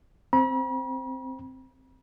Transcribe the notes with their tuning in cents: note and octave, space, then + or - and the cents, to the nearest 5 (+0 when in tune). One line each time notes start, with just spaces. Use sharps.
C4 +0 B5 -45